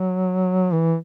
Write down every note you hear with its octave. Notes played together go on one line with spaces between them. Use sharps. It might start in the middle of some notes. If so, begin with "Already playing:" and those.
Already playing: F#3
E3